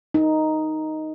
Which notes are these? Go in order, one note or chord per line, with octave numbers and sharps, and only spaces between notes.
D#4